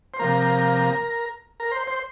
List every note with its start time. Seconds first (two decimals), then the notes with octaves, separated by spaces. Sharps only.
0.14 C5
0.19 C3 F3 A#3 A#4
1.60 A#4
1.71 C5
1.87 C5